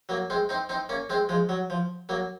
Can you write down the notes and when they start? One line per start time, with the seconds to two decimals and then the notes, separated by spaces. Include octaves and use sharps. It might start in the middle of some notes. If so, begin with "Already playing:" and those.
0.09 F#3 A#3
0.30 G#3 C4
0.49 C4 D#4
0.69 C4 D#4
0.89 A#3 C#4
1.10 G#3 C4
1.29 F3 G#3
1.49 F#3
1.70 F3
2.09 F#3 A#3